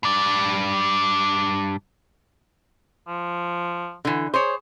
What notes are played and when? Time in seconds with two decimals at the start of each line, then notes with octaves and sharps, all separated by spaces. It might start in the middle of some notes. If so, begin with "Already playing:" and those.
0.03 G2 D5
3.07 F3
4.05 D3 E3
4.34 G#4 C5 C#5